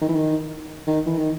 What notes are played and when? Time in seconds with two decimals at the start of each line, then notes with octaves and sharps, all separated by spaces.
0.01 D#3
0.09 E3
0.15 D#3
0.87 D#3
1.06 E3
1.18 D#3